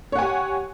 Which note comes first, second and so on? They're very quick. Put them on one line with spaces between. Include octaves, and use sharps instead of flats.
C#5 F#5 G#5 G4